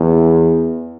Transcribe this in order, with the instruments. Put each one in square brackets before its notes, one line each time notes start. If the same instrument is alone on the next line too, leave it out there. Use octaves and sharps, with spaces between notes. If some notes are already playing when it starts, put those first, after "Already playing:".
Already playing: [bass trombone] E2